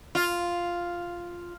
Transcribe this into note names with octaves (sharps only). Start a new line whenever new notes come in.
F4